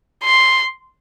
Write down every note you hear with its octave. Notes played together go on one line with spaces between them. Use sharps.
C6